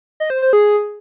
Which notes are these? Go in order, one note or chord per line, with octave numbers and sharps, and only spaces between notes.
D#5
C5
C5
G#4